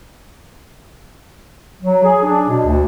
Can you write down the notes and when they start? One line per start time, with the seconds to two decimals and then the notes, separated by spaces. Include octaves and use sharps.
1.83 F#3
2.03 G#4
2.23 D4
2.48 B2
2.64 D2